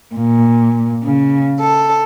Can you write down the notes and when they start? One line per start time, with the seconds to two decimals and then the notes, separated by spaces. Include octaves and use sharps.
0.14 A#2
1.03 C#3
1.60 A4